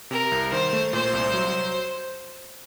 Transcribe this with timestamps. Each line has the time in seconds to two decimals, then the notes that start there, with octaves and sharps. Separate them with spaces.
0.10 C3 A#4
0.32 C2
0.51 D#3 C5
0.73 A3
0.93 A#2 C5
1.13 C2
1.34 F#3